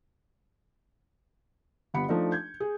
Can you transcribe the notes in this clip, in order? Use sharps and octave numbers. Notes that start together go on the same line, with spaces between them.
G1 B3 G4 F#5 B5 C#7
F3 A3 D4 D#4
G6 G#6
G#4